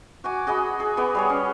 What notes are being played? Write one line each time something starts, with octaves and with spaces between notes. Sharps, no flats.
F#4 G#5 D6
F#4 G#4 D#5 B5
G#4
B3 G#4 D#5 D6
G3 G#4 C#5
C#4